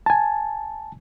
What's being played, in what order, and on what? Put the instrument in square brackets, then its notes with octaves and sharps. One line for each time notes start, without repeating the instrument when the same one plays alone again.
[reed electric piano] G#5 A5